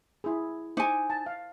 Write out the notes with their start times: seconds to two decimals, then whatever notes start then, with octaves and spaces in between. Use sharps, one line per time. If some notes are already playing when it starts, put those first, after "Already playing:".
0.24 E4 G#4
0.77 D#4 C5 G#5 D6
1.10 A5
1.26 F5